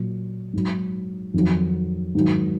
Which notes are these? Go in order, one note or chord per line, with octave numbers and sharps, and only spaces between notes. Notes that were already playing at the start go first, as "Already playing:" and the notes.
Already playing: A#2 F#3
G#2 F#3
F2 D#3 F#3
G#2 D#3 F#3